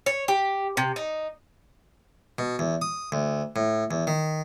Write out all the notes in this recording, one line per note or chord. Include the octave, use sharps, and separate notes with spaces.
C#5
G4
C3
D#4
B2
E2
D#6
D2
A2
E2
D#3